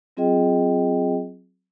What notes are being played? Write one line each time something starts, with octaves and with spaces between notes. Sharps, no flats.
F#3 C4 F4 G#4 D#5 G5